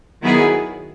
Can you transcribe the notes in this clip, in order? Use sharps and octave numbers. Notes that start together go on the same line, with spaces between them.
D#3 F#3 B3 E4 G#4